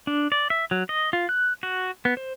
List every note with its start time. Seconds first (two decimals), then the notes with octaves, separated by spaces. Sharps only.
0.07 D4
0.32 D5
0.50 E5
0.71 F#3
0.89 D#5
1.13 F4
1.29 F#6
1.63 F#4
2.05 B3
2.17 C5